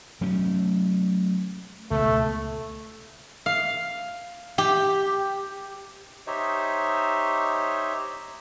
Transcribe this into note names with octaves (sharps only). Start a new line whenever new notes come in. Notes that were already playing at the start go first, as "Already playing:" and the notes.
F#3 A3 C#4
C#2 B2 A3
F5
G4
D#4 G4 C5 C#5 D#5 E5